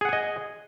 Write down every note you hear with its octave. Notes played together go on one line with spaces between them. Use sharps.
G#4 D#5 F#5 G#5